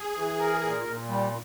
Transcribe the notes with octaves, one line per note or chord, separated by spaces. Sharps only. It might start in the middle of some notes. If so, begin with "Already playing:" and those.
Already playing: G#4
E3
A#4
A#2
A#2
G3